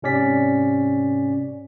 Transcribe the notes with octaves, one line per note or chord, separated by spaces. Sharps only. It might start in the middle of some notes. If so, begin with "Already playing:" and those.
G#2 C3 C#4 D5 B6